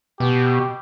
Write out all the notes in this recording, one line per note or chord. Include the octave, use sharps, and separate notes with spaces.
B2 G4